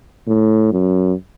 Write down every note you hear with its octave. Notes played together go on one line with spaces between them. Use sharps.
A2
F#2